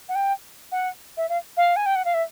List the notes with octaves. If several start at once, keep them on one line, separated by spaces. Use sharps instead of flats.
F#5
G5
F#5
E5
F5
F5
G#5
G5
F#5
F5
E5